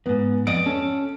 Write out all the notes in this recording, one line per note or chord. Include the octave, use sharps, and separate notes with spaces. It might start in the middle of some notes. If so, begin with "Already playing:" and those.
F2 G#2 B3
F2 D5 D#5 D7
C#4 A4